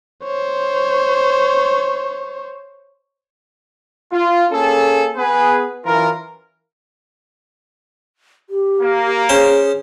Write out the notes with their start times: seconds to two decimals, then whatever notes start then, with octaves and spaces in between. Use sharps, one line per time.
0.24 C5 C#5
4.13 F4
4.52 A#3 C#4 G#4 A4
5.17 B3 G#4 B4
5.86 F#2 E3 F4 A#4
8.50 G4
8.81 A#3
9.29 C#4 G#4 C5